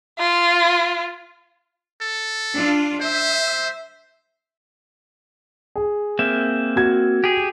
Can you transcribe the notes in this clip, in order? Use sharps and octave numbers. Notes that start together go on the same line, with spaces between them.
F4
A4
D4 F4
C5 E5
G#4
A#3 C4 E5
F#4 G#6
G4 G#4